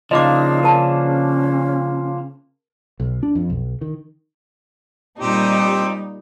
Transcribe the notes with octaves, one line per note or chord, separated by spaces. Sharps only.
C#3 F3 A#3 D4 D#4 D#5 D6
C#4 A#4 A5
B1
D4
F2
B1
D#3
A#2 G3 C4 D#4 G4